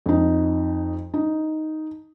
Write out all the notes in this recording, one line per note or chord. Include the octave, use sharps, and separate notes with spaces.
F2 D#4
D#4